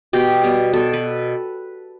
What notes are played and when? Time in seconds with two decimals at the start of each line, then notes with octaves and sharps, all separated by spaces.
0.13 B2 G4
0.43 G3 B3
0.73 B2 A4
0.93 B4